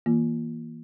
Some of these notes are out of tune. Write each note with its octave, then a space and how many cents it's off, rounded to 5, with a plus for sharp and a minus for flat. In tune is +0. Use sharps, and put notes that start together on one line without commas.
E3 -25 A#3 +10 F4 +0